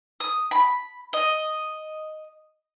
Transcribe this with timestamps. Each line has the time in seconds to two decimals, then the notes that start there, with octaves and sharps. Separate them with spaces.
0.20 D#6
0.51 B5
1.13 D#5